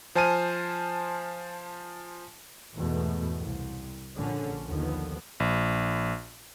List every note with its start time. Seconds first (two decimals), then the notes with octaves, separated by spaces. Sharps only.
0.15 F3 C5 G#5 A5 F6 D#7
2.74 E2 G#2 B2 A3
3.38 C2
4.16 A#1 D3 C#4
4.65 D#2 D3 D#3 F3 B3
5.40 A#1